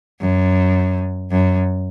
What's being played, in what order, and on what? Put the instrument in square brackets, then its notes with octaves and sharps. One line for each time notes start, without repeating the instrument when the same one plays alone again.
[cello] F#2
F#2